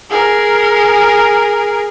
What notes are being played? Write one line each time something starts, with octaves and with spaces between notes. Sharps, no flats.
G#4 A#4